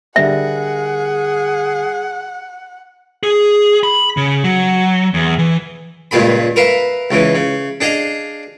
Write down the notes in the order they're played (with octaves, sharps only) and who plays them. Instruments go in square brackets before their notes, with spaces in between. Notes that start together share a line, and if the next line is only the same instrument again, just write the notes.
[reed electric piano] D3 G3 A#4 [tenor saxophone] G#4 [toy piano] E5 [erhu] F#5
[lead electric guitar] G#4
B5
C#3
F#3
E2
E3
[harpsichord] C#2 G2 A#2 G#4 B5
A#4 B4 E5 F5
C#2 C#3 E3
C#3
D4 G#4 D#5 F5